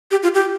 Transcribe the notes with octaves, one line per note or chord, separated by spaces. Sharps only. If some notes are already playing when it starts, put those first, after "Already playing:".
G4
F4
G4